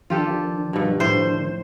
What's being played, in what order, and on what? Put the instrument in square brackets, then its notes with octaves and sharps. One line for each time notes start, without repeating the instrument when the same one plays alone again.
[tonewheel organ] D#3 F3 D4 [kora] F4 G4 A4
[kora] G2 B2
[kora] A2 [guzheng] C5